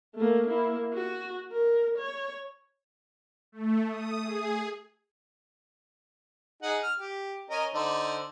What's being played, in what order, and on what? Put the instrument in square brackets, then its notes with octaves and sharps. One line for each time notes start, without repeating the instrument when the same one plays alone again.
[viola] A3 A#3
A#3 E4
F#4
A#4
C#5
[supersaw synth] A3
D#6
G#4
[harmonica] D#4 G#4 F#5
F6
G4
C#4 A#4 D#5
D3 D#4 C5